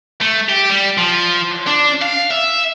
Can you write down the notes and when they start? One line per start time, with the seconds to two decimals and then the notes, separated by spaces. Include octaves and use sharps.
0.21 A3
0.49 G4
0.70 G3
0.98 F3
1.67 D4
2.01 F5
2.31 E5